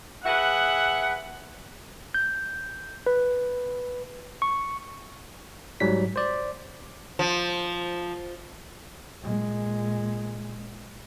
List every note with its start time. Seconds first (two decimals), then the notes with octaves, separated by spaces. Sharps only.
0.24 G#4 B4 E5 F#5
2.14 G6
3.06 B4
4.42 C#6
5.80 G#2 F#3 G3 B6
6.16 C5 D5
7.19 F3
9.22 A#2 G#3